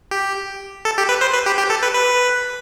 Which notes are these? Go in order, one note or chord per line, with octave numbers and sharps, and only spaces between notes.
G4
A4
G4
B4
C5
B4
G4
G4
A4
B4
B4